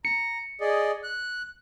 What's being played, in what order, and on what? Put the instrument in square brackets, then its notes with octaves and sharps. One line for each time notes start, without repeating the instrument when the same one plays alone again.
[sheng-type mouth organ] A#5 [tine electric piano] C#7
[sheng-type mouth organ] G#4 D5 D#5
F#6